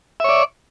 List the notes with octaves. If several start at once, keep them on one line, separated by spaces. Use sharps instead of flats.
C#5 D5 E5